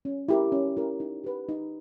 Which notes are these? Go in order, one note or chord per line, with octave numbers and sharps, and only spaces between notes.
C#4
E4 G4 A#4
C#4
E4 G4 A#4
D#4
G4 B4
D#4